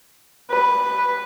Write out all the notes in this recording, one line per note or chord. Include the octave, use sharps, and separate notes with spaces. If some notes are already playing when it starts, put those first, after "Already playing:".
B4